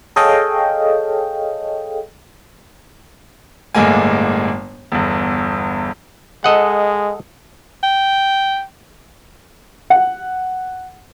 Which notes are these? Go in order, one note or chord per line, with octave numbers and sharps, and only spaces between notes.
G#4 A4 C#5 D#5 F5 G5
G1 A2 G#3 A#3 G#5
G1 E2
G#3 A4 D#5 F#5
G5
F#5